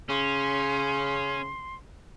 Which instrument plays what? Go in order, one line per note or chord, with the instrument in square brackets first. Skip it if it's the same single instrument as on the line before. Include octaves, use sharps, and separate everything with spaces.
[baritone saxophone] C#3 [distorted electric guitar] C#4 [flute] C6